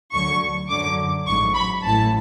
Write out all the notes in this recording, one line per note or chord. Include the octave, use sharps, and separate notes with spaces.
D2 D3 F#3 C#6
F#2 D3 F#3 D6
A1 G#2 F#3 C#6
B5
A1 A2 E3 A5